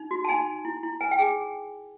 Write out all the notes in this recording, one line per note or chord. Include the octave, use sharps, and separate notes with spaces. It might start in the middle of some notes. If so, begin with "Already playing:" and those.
Already playing: D#4
F#4
A5
D#4 G#5
D#4
E4
E4
B4 G#5
G5
G#4 G#5